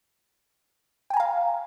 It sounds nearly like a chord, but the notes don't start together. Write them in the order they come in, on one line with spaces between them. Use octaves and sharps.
G5 G#5 A#5 F5